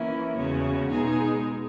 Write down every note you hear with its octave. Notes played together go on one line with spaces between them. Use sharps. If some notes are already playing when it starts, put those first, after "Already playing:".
Already playing: E3 A#3 C#4 E4 A#4
E2 C#3 G#3 C#4 F#4
B2 G#3 D#4 G#4